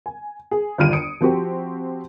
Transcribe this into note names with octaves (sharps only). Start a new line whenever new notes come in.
G#5
G#4
G1 D#2 F4 F6 D7 D#7
D#6 C#7 D7
F3 C4 F#4 G4